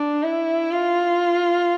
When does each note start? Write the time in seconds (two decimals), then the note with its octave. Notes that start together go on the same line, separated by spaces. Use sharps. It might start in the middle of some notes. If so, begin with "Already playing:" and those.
Already playing: D4
0.23 E4
0.71 F4